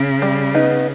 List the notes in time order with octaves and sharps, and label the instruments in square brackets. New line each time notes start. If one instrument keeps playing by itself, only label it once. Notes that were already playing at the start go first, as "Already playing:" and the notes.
Already playing: [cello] C#3
[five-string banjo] G3
B3 D#4